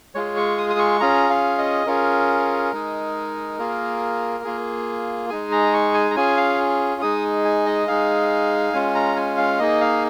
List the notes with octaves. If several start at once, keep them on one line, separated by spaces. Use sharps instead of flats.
G#3 F4 G#4 C#5
C#6
D#6
D#6
C#6
C#4 F4 G#4 A#5
F5
D#5
C#4 F4 G#4 A#4
G#3 D#4 G#4
A#3 F4 G#4
A#3 F4 G#4
G#3 D#4 G#4 G#5
A#5
C#6
G#5
A#5
C#4 F4 G#4 G#5
F5
G#3 D#4 G#4 D#6
G#5
D#5
G#3 D#4 G#4 F5
G#3 C#4 F4 G#5
A#5
G#5
F5
A#3 D#4 G#4 D#5
F5